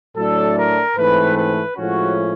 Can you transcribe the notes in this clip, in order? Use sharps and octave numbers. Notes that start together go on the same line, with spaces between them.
A2 F#3 A3 D4 A4
A#4
G#2 E3 A3 C4 B4
B4
A2 F3 G#3 C#4 F#4